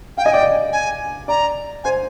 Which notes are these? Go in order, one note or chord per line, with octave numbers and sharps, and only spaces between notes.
F5 G5
D#5 G#5
D5 G5
D#5
G#5
D5 A#5
C5 G#5